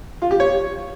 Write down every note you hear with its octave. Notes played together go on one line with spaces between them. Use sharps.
F4
G4
C#5